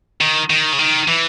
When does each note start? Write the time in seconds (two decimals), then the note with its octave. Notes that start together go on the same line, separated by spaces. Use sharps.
0.21 D#3
0.50 D#3
0.73 C#3
0.79 D#3
1.08 E3